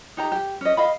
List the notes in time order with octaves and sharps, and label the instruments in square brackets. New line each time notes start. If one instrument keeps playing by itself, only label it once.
[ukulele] D#4 G4 A#5
G4
C#4 D#5
D#5 F5 B5